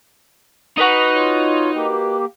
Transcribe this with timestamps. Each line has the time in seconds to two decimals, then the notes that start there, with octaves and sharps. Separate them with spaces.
0.77 D#4 F#4 B4 D#5
1.15 F4 C#5
1.75 A#3 G4